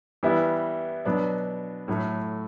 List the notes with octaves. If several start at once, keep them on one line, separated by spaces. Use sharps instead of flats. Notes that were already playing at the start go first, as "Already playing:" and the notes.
E3 G3 B3 E4
B2 F#3 B3 D4
A2 F#3 A3